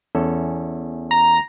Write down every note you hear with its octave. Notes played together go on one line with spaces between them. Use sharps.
E2 C#4 A4
A#5